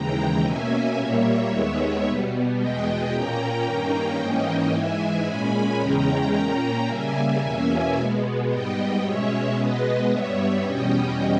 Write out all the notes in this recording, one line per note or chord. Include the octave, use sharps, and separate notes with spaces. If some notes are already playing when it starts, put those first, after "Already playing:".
Already playing: D#2 C#3 E3 G#3 G5 A#5
B2 A#3 C#4 E5 G#5
A#2 G3 A#3 C#5 E5
D#2 D#3 G#3 B3
B2 G3 B3
E2 B2 G#3 B3 D#5 G5
A#2 A#3 C#4 G5 A#5
G2 D#3 A#3 C#4
G#2 E3 A#3 C#4 D#5 G5
G#2 E3 G#3 E5 G#5
A#2 G#3 C#4 G#5 B5
E2 C#3 G#3 C#4 G5 A#5
A#2 A#3 C#4
C#3 G3 A#3 E5 G#5
E2 B2 A#3 C#4
B2 G#3 B3
G#2 G3 B3 D#5 G5
B2 G#3 C#4 C#5 E5
B2 G#3 B3 B4 D#5
G2 G3 B3 C#5 E5
E2 B2 G3 C#4 D#5 G5